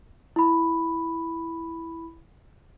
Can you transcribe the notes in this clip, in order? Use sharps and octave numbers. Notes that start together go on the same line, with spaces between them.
E4 B5